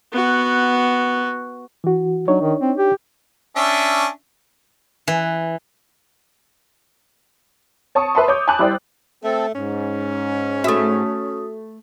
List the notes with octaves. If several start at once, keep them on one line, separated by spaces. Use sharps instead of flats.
B3 F#4
E3 F#4
F#3 D4 D#4 C#5
D#3
C4
G4
C#4 D4 E5
E3
C#5 A5 C#6 D#6
B4 E5 A5 B5 C6
C#5 D6 D#6 G6
G#5 A5 B5 D6 F#6
G3 E4 C5 D5 G5
A3 C4 A4
G#2 C#4
A3 F#4 E5 D#6